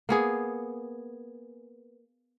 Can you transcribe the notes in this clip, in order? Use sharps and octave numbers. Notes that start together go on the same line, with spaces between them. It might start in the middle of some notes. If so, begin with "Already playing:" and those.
A#3 B3 G#4